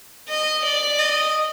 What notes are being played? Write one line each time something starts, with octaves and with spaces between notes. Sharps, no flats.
D#5
D5
D#5